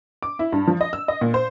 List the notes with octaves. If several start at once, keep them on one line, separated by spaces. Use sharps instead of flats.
D6
E4
G2
F3
D#5
E6
D#5
A#2
C5